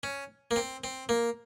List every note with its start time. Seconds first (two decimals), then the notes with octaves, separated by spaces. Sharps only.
0.03 C#4
0.51 A#3
0.56 C4
0.84 C4
1.09 A#3